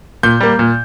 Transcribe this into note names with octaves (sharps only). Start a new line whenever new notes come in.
A#2 G6
G3 A#3
A#2